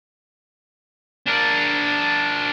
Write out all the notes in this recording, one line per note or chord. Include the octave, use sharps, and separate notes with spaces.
D4 A#4